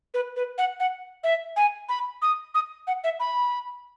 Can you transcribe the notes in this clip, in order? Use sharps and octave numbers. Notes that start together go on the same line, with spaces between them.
B4
B4
F#5
F#5
E5
G#5
B5
D#6
D#6
F#5
E5
B5